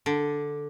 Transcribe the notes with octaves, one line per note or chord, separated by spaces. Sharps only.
D3